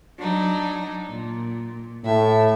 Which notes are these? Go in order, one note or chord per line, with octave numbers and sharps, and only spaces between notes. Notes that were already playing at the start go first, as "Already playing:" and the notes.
F#3 D4 D#4
A#2
A2 E5